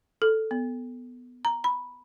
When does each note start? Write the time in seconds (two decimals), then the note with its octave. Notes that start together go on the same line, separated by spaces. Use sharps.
0.22 A4
0.51 B3
1.45 A#5
1.64 B5